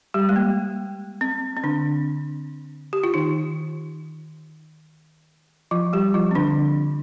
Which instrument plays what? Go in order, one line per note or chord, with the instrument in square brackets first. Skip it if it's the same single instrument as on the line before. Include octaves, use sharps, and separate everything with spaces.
[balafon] G3 G4
G#3
A#3
C4
C4
D3 D4
G4
F4
D#3 D#4
F3 F4
G3 G4
F3 F4
C4
D3 D4